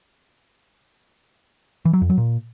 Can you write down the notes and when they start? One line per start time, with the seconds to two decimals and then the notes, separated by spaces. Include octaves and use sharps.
1.85 E3
1.93 F#3
2.01 F2
2.10 F#3
2.18 A#2